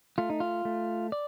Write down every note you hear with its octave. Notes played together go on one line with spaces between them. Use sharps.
A3 F4
D#4
F4
A3
D5